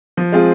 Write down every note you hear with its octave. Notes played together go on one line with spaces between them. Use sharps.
F3
G#3 C4 F4 G#4